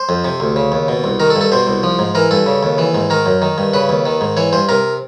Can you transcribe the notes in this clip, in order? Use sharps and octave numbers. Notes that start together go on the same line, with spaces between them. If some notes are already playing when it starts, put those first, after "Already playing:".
Already playing: C5
F2
C3
D2
C#3
D#2
B2
C2
D#3 A#4
A4
G2
A4
B2 C5
C2
F3
G#2
E3 A#4
G2 A4
C#3
D#2
E3
G#2
D#3 A#4
F#2
D#3
G2
C#3 B4
D#2
D#3
G#2
E3 C#5
G2 C5
C3 A#4